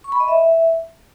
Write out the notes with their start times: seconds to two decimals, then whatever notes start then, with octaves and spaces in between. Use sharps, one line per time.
0.04 C#6
0.12 B5
0.20 D#5
0.28 E5